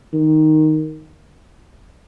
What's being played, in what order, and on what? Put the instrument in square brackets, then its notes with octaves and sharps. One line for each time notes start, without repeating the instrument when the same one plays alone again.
[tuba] D#3